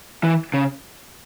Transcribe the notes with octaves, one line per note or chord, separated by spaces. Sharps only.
E3
C#3